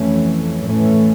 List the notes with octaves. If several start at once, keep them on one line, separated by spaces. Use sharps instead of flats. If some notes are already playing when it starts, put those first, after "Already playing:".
Already playing: F2 E3 A3 C#4
A2 E3 A3 C#4